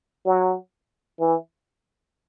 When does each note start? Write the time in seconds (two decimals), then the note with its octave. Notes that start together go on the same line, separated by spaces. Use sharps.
0.26 F#3
1.20 E3